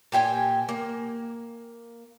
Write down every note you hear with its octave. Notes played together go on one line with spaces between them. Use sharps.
A#2 G4 G5 G#5
A#3